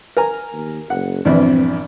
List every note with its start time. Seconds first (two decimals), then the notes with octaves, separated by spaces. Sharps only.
0.17 A#4 G#5 A#5
0.53 D#2
0.90 F#1 F#5
1.25 A#1 E2 G2 C4